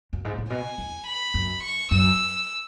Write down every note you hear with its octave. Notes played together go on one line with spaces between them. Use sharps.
F#2
G#2
A2
B2 G#5
E2
B5
F#2
C#6
F#2 E6